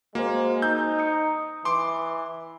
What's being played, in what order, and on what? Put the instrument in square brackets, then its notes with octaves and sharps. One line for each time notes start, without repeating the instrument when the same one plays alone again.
[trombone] G#3 [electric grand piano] A#3 [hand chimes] F#4 C5
[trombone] D#4 [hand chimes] E6 [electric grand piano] G6
[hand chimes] D#6 C#7
[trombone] E3 [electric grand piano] C6 D6